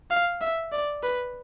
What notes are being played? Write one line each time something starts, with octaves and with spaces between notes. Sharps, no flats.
F5
E5
D5
B4